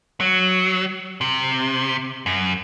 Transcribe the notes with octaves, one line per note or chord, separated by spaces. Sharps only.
F#3
C3
F#2